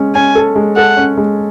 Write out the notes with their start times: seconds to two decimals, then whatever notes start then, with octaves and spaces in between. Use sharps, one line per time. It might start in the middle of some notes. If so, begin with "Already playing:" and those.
Already playing: G#3 C#4
0.15 C#4 G#5
0.35 A4
0.56 G#3
0.76 A4 F#5
0.97 C#4
1.17 G#3